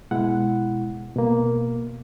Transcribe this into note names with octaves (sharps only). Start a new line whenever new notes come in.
B2 G#3 E4 F#5
B2 A#3